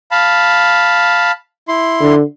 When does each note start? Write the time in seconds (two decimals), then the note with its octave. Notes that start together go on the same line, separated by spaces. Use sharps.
0.11 F5 A5 B5
1.68 E4 C6
2.01 D3